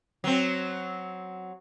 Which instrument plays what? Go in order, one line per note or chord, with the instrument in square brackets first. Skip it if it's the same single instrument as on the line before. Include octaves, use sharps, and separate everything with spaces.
[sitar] F#3 C4